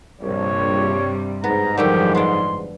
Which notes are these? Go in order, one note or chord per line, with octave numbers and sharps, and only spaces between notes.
A#1 G2 C3 G3 C#5
G#2 B3 A#5
F#2 D3 D#3 F3 G3 A3 G4
B3 D4 C6